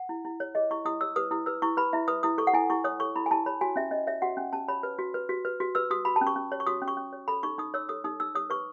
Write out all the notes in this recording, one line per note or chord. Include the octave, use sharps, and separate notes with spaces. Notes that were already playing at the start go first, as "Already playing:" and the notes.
Already playing: F#5
E4
E4
C#5
G#4 D#5
E4 C#6
E4 D#6
C#5 E6
B4 D#6
E4 D#6
B4 E6
E4 C#6
B4 B5
E4 E5
B4 D#6
E4 D#6
A4 C#6
F#5
E4 G#5
E4 C#6
C#5 D#6
A4 C#6
E4 B5
G#5
E4 A5
C#5 B5
F#4 G#5
C#4 E5
C#4 D#5
C#5 E5
F#4 F#5
C#4 G#5
C#4 A5
C#5 B5
B4
F#4
B4
F#4
B4
F#4
B4 E6
F#4 D#6
F#4 B5
A5
C#4
C#6
C#4
C#5
C#6
F#4 D#6
C#4
C#6
C#4
C#5
A4 B5
D#4 C#6
D#4 D#6
C#5 E6
A4 D#6
D#4 D#6
D#4 E6
C#5 D#6
B4 C#6